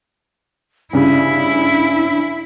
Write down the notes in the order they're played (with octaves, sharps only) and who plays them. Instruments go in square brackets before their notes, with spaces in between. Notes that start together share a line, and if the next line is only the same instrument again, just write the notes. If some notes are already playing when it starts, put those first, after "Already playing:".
[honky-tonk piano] G2 C#3 [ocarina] D4 [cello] E4